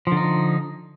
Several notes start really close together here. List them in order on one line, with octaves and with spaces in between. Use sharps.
F3 D3 D#4